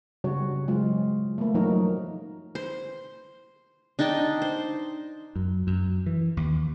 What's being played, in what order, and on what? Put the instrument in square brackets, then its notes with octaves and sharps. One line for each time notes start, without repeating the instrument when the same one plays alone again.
[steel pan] C#3 G3 F#4 C#5
F#3 G#3 F4
A3 A#3
F3 F#3 D#4 F#4 A#4
[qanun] C5
D4 D#4 G5 A5
C5
[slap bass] F#2
F#2
E3
D#2